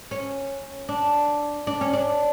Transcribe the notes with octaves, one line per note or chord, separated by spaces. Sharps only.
C#4
D4
D4
C#4
D4